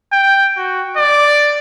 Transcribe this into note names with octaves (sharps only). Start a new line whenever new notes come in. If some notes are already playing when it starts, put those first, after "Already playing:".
G5
F#4
D5